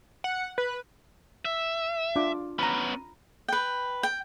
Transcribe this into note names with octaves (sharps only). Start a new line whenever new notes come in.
F#5
B4
E5
D4 F4 D6
B3 C#4 A#5 B5
B4 G5
G5